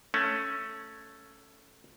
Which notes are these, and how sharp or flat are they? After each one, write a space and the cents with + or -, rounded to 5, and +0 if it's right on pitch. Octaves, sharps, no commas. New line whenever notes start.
A3 +5 C#4 +0